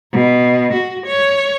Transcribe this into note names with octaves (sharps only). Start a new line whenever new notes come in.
B2
F#4
C#5